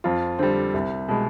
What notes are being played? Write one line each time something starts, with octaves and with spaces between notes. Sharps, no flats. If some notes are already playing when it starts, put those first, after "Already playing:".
F2 F4
D3 G3 C4
C2
B2 G#3